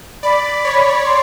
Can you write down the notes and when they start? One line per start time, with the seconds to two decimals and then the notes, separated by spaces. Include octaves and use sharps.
0.23 D5 B5
0.65 C#5
1.05 C6